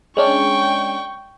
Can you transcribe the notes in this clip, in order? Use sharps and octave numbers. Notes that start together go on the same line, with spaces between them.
G#3 C#4 D4 G5 C#6